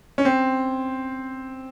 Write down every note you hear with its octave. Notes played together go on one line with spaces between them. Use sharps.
C#4
C4